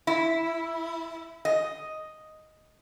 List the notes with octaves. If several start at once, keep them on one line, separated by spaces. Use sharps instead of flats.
E4
D#5